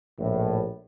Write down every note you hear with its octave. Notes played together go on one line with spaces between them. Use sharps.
A#1 A2